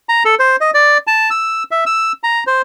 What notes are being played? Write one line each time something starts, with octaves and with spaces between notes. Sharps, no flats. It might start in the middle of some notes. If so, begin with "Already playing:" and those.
A#5
A4
C5
D#5
D5
A5
E6
E5
E6
A#5
C5